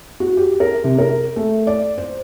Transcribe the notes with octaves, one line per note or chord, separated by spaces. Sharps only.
F#4
G4
A#4
C3
A#4
A3
D5
C5